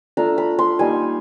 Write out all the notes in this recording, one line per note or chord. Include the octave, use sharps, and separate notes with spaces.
A3 D4 F4 A#5
B5
C6
G3 A#3 D#4 G#5